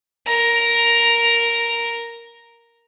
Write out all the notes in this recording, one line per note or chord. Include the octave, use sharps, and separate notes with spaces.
A#4 A#5